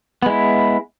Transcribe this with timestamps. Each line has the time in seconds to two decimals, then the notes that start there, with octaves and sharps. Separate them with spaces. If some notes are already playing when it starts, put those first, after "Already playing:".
0.22 B3
0.26 G#3
0.30 E4